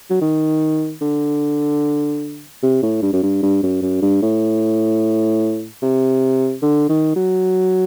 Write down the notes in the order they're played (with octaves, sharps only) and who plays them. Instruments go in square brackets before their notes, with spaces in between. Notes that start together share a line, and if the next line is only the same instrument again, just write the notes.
[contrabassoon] F#3
D#3
D3
C3
A2
G2
F#2
G2
G2
F#2
F#2
G2
A2
C3
D3
D#3
F#3